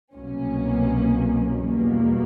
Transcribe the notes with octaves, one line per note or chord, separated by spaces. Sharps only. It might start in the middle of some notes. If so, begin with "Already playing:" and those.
C2 B2 F#3 A#3 C#4
E2 B2 G3 A#3